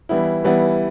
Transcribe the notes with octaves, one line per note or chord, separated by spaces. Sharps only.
E3 G3 B3 E4
E3 G3 B3 E4